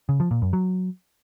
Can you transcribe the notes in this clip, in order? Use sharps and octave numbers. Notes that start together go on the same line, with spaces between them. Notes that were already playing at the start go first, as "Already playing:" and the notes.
C#3
F3
A#2
F#2
F#3